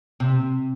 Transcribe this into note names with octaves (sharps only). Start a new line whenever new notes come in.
C3